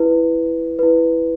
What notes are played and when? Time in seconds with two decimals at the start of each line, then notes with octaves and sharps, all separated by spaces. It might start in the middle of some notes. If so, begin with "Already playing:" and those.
Already playing: E4 B4
0.79 E4 B4